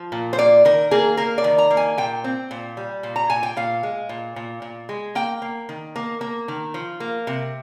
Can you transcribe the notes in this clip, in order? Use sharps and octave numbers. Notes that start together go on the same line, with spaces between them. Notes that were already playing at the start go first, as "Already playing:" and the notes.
Already playing: F3
A#2
C5
A#3 D5
D#3 A#4
A#3 G#4
A#3 A#4
D5
D#3
A#5
A#3
G#5
A#2 G5
C4
A#2
G3
A#2
A#5
A#2 G#5
G5
A#2 F5
G#3
A#2
A#2
A#2
G#3
A#3 G5
A#3
D#3
A#3
A#3
D#3
F3
A#3
C3